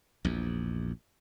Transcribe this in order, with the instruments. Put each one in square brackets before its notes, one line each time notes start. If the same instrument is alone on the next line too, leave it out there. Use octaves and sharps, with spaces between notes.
[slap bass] A#1 E2